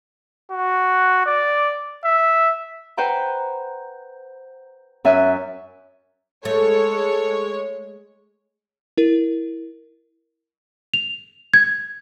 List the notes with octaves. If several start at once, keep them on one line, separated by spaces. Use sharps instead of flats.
F#4
D5
E5
B4 C5 F#5 G5 A#5
F#2 E5 G#5 F#6
G#3 A3 A4 C#5
E4 A#4
F7
G#6